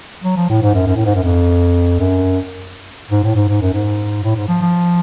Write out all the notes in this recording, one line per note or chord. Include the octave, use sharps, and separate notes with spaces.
F#3
F3
A2
G#2
F#2
F#2
A2
G#2
F#2
F2
F#2
G#2
A2
G#2
G#2
F#2
G#2
A2
G#2
F3
F3